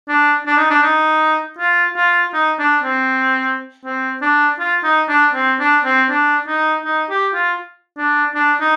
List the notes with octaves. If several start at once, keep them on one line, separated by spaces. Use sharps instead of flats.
D4
D4
D#4
D4
D#4
F4
F4
D#4
D4
C4
C4
D4
F4
D#4
D4
C4
D4
C4
D4
D#4
D#4
G4
F4
D4
D4
D#4